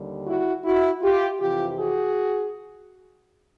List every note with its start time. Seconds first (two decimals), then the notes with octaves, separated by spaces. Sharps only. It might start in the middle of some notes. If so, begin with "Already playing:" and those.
Already playing: D#2 D3 G3
0.26 E4 F#4
0.64 E4 F#4
1.02 F4 G4
1.40 F2 C3 E3 F4 G4
1.78 F#4 G#4